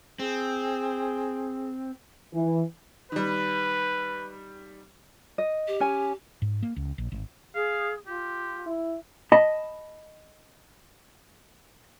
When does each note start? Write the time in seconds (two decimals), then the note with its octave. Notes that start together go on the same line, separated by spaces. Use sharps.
0.19 C4 G#4
2.34 E3
3.12 D#3 G3 B4
5.38 D#5
5.68 G4
5.80 C#4 G#5
6.42 G#2
6.63 A#3
6.76 C#2
6.98 A#1
7.12 G#1
7.55 G#4 F5
8.07 F4 G4
8.66 E4
9.32 D#5 A5 B5